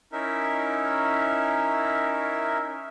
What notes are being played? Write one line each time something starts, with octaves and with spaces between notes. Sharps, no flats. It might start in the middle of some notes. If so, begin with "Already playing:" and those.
C#4 D#4 E4 A#4 E5